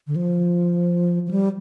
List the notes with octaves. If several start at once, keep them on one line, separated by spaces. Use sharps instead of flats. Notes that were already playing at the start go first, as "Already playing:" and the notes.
D3
F3
F3
G3